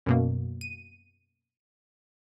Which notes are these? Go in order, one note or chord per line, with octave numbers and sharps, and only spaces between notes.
F#2 B2 A#3
D#7